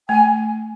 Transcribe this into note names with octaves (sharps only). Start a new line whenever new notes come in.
A3 G#5